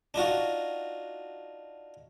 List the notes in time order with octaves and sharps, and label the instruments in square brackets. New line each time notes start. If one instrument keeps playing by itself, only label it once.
[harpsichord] D4 D#4 F4 F#4